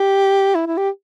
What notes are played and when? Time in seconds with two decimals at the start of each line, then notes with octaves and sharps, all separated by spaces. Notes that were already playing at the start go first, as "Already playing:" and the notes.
Already playing: G4
0.55 E4
0.67 E4
0.78 G4